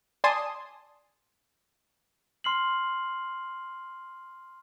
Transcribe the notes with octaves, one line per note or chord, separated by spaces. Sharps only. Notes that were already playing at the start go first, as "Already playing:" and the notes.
D5 G#5 A5 C6 D#6
C6 F6 C7 F#7